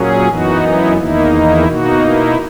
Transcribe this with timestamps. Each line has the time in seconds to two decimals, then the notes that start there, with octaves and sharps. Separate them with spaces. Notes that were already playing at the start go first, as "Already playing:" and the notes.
Already playing: A#2 F#3 C#4 G#4
0.28 F#2 E3 B3 D#4 F#4
0.62 E4
0.97 E2 D#3 A#3 D#4 E4
1.32 E4
1.66 B2 A#3 D#4 F#4
2.01 E4